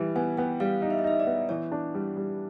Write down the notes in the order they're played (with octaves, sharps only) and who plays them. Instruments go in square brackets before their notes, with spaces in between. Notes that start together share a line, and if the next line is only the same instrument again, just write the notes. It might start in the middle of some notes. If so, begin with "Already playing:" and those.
Already playing: [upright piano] E3 G3
[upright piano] B3 [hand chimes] G#5
[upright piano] B3 [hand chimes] G5
[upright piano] G3 [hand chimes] F5
[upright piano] D#4
[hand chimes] E5
D#5
[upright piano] D#4 [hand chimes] E5
[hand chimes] D5
[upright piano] B3
[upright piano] E3 [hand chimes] C#5
[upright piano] D4
G3
G3